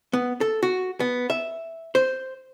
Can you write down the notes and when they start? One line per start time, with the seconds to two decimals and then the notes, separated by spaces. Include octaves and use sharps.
0.13 B3
0.41 A4
0.63 F#4
1.00 B3
1.30 E5
1.95 C5